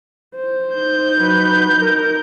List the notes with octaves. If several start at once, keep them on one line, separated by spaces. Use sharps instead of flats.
C5
D#4 G6
F#3 B4
A#4